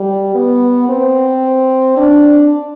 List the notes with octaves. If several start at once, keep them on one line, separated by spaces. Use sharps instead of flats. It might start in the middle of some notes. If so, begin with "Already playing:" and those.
Already playing: G3
B3
C4
D4